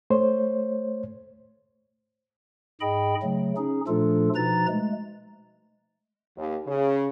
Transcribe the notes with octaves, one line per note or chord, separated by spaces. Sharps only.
A3 C5 C#5
G#2 G#4 D#5 G5 B5
C#3 F#3 A3
C#4 D#4 G#4
A#2 F3 A3 D4 F4 A4
B2 F3 D#4 B4 A#5 A6
G#3 A3
D#2
C#3